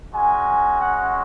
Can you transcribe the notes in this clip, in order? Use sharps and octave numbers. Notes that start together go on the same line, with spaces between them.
G#3 C#4 F#4 G#5
F#5